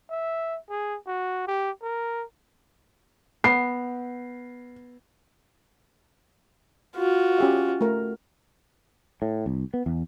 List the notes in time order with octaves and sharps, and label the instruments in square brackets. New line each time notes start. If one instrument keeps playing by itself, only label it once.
[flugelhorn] E5
G#4
F#4
G4
A#4
[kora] B3 [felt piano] C7
[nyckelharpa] F4 F#4
[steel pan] C#4 G4 E5
A3 A#4
[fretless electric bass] A2
C2
B3
E2